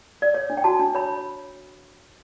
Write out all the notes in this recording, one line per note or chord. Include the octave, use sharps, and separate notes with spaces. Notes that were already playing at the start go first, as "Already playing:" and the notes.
D5
C#5
D4
G5
F#4 A5
D4
C#5 B5